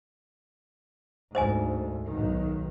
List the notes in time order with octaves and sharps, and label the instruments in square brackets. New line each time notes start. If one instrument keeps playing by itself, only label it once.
[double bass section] D2 G#2 [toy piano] C5 D#5 G#5
[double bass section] B1 B2 D#3